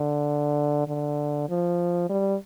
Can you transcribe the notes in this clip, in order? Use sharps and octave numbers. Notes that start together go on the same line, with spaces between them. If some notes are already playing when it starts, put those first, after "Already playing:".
Already playing: D3
D3
F3
G3